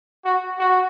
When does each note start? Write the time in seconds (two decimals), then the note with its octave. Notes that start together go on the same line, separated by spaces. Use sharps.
0.25 F#4
0.59 F#4